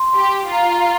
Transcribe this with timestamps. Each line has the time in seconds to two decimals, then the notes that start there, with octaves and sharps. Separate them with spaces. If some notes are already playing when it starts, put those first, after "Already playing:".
Already playing: C6
0.17 G4
0.51 F4 A#5